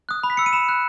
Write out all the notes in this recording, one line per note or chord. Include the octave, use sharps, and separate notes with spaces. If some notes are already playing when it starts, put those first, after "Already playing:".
D#6 F#6
B5
B6
E6 C#7
D#7
B5 E7
F#6